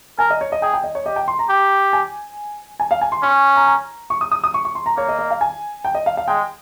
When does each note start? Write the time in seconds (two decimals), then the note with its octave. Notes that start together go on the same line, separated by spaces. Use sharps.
0.19 A#4 G#5
0.30 D#5
0.41 C#5
0.52 D#5
0.62 G#4 G5
0.73 G5
0.84 D#5
0.95 C#5
1.06 G4 D#5
1.16 G5
1.28 C6
1.39 A#5
1.50 G4
1.93 G#5
2.80 G#5
2.91 F5
3.01 G#5
3.12 C6
3.23 C#4 C#6
3.56 A#5
3.67 A#5
4.10 C#6
4.21 D#6
4.31 D#6
4.44 D#6
4.54 C#6
4.65 C#6
4.75 C6
4.86 A#5
4.97 A#3 C#5
5.09 D#5
5.19 D#5
5.31 F5
5.41 G#5
5.85 G5
5.95 D#5
6.06 F5
6.17 F5
6.28 G#3 G5